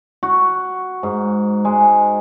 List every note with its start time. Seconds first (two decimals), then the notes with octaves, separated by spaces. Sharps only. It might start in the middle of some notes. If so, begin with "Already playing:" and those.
0.23 F#4
1.03 G#2
1.65 G#3